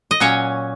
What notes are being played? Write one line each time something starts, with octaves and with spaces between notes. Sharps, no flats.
D#5
A#2 F#3 C#4 C#5